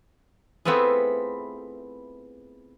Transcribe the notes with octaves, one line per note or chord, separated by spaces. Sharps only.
A3 B3 C4 E4 F4 G#4